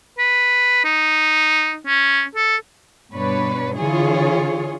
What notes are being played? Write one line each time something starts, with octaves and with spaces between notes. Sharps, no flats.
B4
D#4
C#4
A4
G2 B2 D4 B4 C#5
D3 E3 F4 G#4 C#5